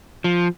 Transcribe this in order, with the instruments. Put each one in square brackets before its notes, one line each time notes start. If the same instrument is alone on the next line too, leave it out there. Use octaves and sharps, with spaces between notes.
[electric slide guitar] F3